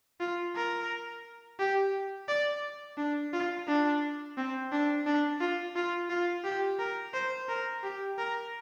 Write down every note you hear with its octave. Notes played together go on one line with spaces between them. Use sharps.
F4
A#4
G4
D5
D4
F4
D4
C4
D4
D4
F4
F4
F4
G4
A#4
C5
A#4
G4
A#4